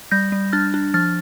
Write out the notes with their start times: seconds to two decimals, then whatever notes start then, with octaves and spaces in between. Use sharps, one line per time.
0.11 G3 G6 A#6
0.32 G3
0.53 D4 F6 A6
0.74 D4
0.94 F3 F6 A6